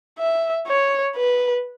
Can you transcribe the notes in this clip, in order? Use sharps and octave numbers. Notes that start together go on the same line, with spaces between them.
E5
C#5
B4